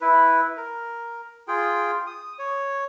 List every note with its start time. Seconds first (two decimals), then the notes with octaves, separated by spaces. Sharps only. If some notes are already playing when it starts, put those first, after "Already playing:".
0.01 E4 B4
0.57 A#4
1.48 F4 G#4 G5
2.07 D#6
2.39 C#5